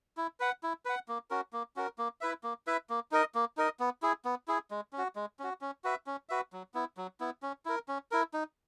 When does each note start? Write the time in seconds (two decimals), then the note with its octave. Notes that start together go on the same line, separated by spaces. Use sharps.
0.17 E4
0.40 B4 F#5
0.63 E4
0.85 B4 F#5
1.08 A#3
1.30 C#4 F#4 A#4
1.53 A#3
1.76 C#4 F#4 A#4
1.98 A#3
2.21 E4 B4 E5
2.43 A#3
2.67 E4 B4 E5
2.90 A#3
3.11 D#4 A#4 D#5
3.35 A#3
3.57 D#4 A#4 D#5
3.80 B3
4.02 E4 G#4
4.25 B3
4.48 E4 G#4
4.71 G#3
4.93 C#4
4.98 F#4
5.16 G#3
5.39 C#4 F#4
5.61 C#4
5.84 F#4 B4 E5
6.06 C#4
6.29 F#4 B4 E5
6.53 F#3
6.74 B3 E4
6.97 F#3
7.20 B3 E4
7.42 C#4
7.65 E4 A#4
7.88 C#4
8.11 E4 A#4
8.34 D#4